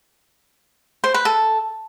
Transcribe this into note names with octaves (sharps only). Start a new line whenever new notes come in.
C5
B4
A4